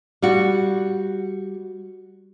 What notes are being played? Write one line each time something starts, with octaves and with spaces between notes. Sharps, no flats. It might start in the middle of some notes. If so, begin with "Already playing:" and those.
G3 F#4